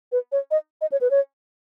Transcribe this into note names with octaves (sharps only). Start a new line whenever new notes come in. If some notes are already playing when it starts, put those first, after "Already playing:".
B4
C#5
D#5
D#5
C#5
B4
C#5